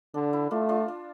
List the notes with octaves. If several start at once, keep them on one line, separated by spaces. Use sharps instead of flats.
D3 D4
E4
A3 D4 F4
D4 F4
D4